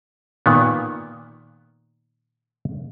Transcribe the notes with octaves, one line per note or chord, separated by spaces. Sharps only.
A#2 D#3 B3